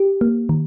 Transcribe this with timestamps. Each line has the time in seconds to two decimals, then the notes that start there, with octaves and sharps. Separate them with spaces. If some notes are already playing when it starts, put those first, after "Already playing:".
Already playing: G4
0.21 A#3
0.49 D#3